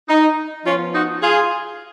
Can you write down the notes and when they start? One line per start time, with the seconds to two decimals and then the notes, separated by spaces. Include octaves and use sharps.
0.09 D#4
0.65 F3 B3 C#4 F4
0.94 D#4 F#4
1.22 F4 G#4